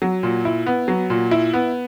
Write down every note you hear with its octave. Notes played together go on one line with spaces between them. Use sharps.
F#3
A#2
E4
B3
F#3
A#2
E4
B3